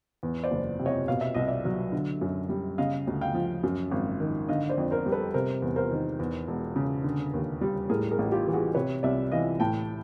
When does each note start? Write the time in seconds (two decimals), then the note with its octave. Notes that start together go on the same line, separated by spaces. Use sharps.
0.23 E2
0.44 C5 D5
0.51 F#1
0.79 C3
0.86 C#5 D#5
1.08 B2 F5
1.21 E5
1.34 C2 D#5
1.47 D5 E5
1.65 F#3
1.92 D3
2.21 F#2
2.49 G3
2.78 C#3 D#5 F5
3.07 D2
3.21 F5 G5
3.34 F3
3.63 F#2
3.92 G#1
4.20 D#3
4.48 D3 D#5 F5
4.70 C5 D5
4.78 F2
4.91 A#4 C5
5.06 G3
5.12 A4 B4
5.34 C3 A#4 C5
5.62 E2
5.76 A#4 C5
5.91 D#3
6.19 E2
6.48 E1
6.76 C#3
7.04 D3
7.34 D#2
7.61 G3
7.89 A2 G#4 A#4
8.11 G#4 A#4
8.19 A1
8.32 F4 G4
8.47 E3
8.53 F#4 G#4
8.74 C3 B4 C#5
9.03 C2 D5 E5
9.32 E3 D#5 F5
9.60 A2 G5 A5